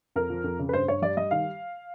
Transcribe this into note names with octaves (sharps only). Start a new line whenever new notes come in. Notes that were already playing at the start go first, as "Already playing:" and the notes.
F2 A#4
F3
F2
C#3
B4
G2 C5
G2 C#5
G3 D5
G3 D#5
D#3 F5